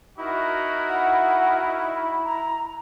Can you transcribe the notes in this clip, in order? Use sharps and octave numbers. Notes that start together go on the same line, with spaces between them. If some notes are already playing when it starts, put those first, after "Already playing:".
D#4 E4 F#4 A#4
F#5
B5
A#5